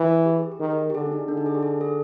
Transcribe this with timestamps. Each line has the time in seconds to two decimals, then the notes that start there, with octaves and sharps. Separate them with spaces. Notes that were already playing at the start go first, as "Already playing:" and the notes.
Already playing: E3
0.26 G4
0.39 G#4
0.52 G4
0.60 D#3
0.90 G4
0.95 D3 G#4
1.07 D4
1.12 D#4
1.28 D3 D4
1.37 D#4
1.46 G#4
1.55 G4
1.63 G#4
1.81 A4